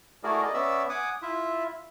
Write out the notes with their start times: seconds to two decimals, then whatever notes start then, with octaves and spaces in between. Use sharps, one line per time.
0.24 A3 E4 F#4 G#4 A#4 D5
0.42 D5 D#5
0.54 B3 C#4 D5 E5 E6
0.89 F#5 G#5 D6 D#6
1.22 E4 F4 E5